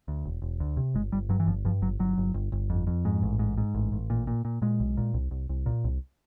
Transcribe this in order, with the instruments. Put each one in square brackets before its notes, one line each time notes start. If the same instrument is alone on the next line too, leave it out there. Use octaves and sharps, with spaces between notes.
[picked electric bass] D2
E1
E1
D2
C3
G1 G#3
G1 G3
G2 F#3
E3
G1 F3
G2 F3
G1 F#3
G1 F#3
G1
G1
G1
F2
F2
G#2
A1
G#2
G#2
A1
A1
A#2
A#2
A#2
A#2 G#3
B1
A#2
C2
C2
C2
A#2
C2